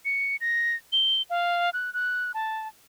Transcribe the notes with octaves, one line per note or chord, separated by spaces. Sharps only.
C#7
A#6
G7
F5
F#6
F#6
A5